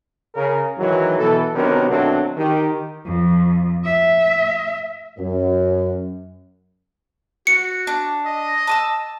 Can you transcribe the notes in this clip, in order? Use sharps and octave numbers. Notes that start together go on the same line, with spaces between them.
C#3 A#4
G#2 D#3 E3 F#3
B2 E3 A4
C3 D#3 F#3 B3 D4 A#4
B1 D#3 F#3 A3 C4 D4
D#3 G4
F2
E5
F#2
F#4 C#7
D4
D#5
A5 D#6 E6